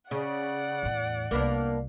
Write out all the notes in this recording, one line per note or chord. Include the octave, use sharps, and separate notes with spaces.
C#3 D5 F#5
E2 A2
C2 A#3 B3 D4